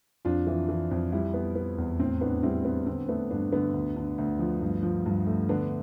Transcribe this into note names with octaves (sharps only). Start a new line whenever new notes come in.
F2 D4 F4
E3
E3
F2
G3 E4 G4
B3
B3
E2
A2 C4
A2 B3 D4
G3 C4 E4
B3 C4
D3 C4
A3 B3 D4
G2 B3 D4
D3 B3 D4
D2
D3
D2
F3
G2
F3
G2
A3
D3 B3 D4